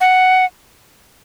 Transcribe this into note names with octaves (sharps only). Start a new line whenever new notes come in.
F#5